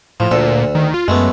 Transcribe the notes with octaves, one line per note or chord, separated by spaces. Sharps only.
A2 F3
D2 A#2 A4
D#3
F4
F#2 G#3 A3 B3